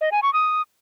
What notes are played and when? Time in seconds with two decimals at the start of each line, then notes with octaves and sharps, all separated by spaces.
0.01 D#5
0.12 G#5
0.23 C#6
0.33 D#6